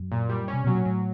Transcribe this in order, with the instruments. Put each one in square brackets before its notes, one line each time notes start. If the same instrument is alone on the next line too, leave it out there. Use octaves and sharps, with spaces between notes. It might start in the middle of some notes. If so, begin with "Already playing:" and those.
Already playing: [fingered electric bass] F#2
[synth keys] A#2
G3
C#4
[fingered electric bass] C3
[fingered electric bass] B2 [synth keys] F#3
[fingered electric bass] A#2
[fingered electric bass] A2 [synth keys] F#3